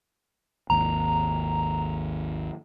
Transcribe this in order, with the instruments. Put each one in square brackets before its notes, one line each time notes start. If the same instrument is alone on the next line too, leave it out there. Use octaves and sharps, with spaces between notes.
[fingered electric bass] G#1 D#2 [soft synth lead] A#5